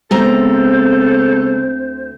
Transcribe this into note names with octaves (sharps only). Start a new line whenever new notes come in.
D2 C#3 G#3 B3 C4 A4 C5 A#5